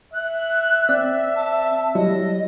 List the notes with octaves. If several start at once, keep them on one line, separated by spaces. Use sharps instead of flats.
E5 F#6
C4 D5
A5
F#3 G3 E4 D#5